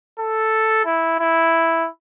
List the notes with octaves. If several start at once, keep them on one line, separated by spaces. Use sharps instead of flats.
A4
E4
E4